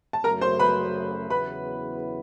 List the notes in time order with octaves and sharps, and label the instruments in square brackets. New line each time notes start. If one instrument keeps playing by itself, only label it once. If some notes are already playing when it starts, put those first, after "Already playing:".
[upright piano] A5
[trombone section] F#2 C#3 F#3 A3 [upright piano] A#4 A#5
[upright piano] C5 C6
B4 B5
[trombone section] E2 C#3 F#3 B3 E4 [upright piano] B4 B5